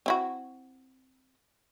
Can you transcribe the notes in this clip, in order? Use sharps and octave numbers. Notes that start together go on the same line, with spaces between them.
C4 E4 F#4